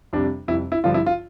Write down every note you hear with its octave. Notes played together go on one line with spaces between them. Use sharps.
F2 C3 G3 D4
F2 C3 G3 E4
E4
G2 D3 F3 F4
E4
F4